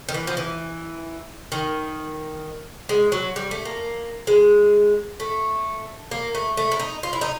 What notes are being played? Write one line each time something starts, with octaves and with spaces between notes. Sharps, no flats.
D#3
E3
F3
E3
D#3
G#3
F#3
G3
A3
A#3
G#3
A3
A#3
A3
A3
E4
D#4
F4
E4
D#4